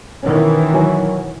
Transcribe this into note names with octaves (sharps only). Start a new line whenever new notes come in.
B2 D#3 E3 B3 C#4
F#3 F#4 G#5